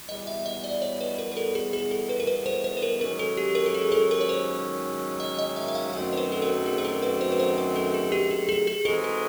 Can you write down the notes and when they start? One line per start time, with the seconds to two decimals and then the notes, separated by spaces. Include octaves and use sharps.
0.09 E2 B2 G3 B3 D#5
0.27 E5
0.46 D#5
0.64 D5
0.82 C#5
1.01 B4
1.18 A#4
1.32 A#4
1.37 A4
1.55 G#4
1.73 G#4
1.91 A4
2.09 B4
2.20 A#4
2.27 B4
2.46 C5
2.64 C5
2.77 B4
2.82 A#4
3.01 G#2 D#3 F#3 A#3 C#4 A#4
3.19 A4
3.37 G4
3.55 A#4
3.66 A4
3.74 G#4
3.92 A4
4.11 A#4
4.21 C#5
4.29 C5
5.20 D#5
5.39 D#5
5.56 E5
5.68 E5
5.75 F5
5.93 F#2 D#3 F#3 A3 C4 F5
6.13 C5
6.17 B4
6.32 A4
6.42 A#4
6.66 G#4
6.78 A#4
6.85 A4
7.03 B4
7.21 C5
7.32 B4
7.40 C5
7.58 B4
7.76 A4
7.94 G#4
8.12 G4
8.31 G#4
8.49 G#4
8.67 G#4
8.85 E3 G#3 C4 D#4 F#4 A4
9.04 A4